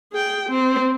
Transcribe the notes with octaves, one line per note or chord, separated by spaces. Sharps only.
G#4 G5
C4